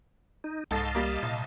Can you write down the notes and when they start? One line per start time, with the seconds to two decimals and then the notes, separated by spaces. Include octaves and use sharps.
0.44 D#4
0.71 C2 G#2 A4 D#5 F5 A5 A6
0.95 G3 A#3
1.23 C2 A#2